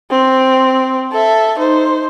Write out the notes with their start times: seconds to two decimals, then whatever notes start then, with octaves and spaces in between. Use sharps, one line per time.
0.11 C4
1.12 A4 E5
1.59 D#4 C5